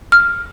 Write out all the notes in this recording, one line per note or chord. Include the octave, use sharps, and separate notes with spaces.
F6